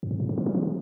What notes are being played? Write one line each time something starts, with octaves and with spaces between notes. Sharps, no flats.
F#2
G2
A2
C#3
E3
F#3
E3
D3